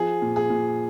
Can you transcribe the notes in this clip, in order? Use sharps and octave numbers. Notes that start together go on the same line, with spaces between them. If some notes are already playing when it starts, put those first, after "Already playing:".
Already playing: F3 G#4
A#2
G#4
A#2